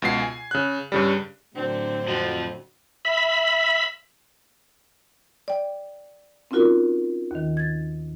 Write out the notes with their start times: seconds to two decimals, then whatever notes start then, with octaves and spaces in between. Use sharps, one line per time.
0.02 C#2 B2 C7
0.22 G#5
0.51 C#3 F#6
0.92 G2 C#3 G3
1.56 A2 D3 F#3 C4 D4
2.08 F2 F3 F#4
3.05 E5 B5
5.48 D5 G5
6.51 C4 C#4 D#4 F4 F#4 A#4
7.31 D#2 D#3
7.57 G#6 A6